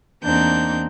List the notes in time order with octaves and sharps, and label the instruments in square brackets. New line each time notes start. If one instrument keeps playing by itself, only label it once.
[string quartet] E2 A#3 C4 D4 D#4 G6